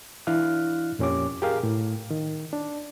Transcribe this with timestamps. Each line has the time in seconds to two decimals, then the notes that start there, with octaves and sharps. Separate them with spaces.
0.27 E3 D4 E4 F5 F6 F#6
0.99 F2 A#2 C#4 G4 D6
1.42 G4 G#4 A#4 F5
1.63 A2
2.11 D#3
2.53 D4